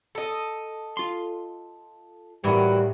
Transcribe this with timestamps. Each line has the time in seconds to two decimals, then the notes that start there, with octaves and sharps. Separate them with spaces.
0.15 A4 D#5
0.97 F4 C6
2.44 A2 D#3 E3 F#3 G3 F#4 A#4